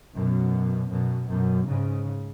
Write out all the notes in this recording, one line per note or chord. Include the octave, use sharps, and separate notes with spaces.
F#2 B2
F#2 B2
F#2 B2
G#2 C#3